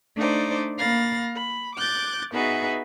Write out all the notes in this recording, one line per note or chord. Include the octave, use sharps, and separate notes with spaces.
A3 D4 D#4 C5 D5
A#3 F5 B5 A6 A#6
B5
D6 F#6 G6 A6
B3 D#4 F#4 G#4 B4 E5